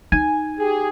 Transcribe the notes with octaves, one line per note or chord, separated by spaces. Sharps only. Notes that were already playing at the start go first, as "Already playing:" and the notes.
D#4 G#5
G4 G#4